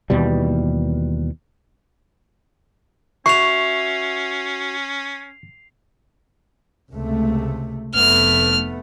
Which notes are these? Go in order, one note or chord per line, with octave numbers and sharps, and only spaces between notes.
D#2 B2 E3 G3
C#4 F#4 E5 C#6 C7 F7
C#2 C3 A3
F1 A3 B3 F6